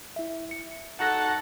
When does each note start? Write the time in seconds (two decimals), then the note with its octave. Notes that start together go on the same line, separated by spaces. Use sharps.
0.16 E4 E5
0.51 C#7
0.99 D#4 F#4 A4 F#5 A5 F#6 A#6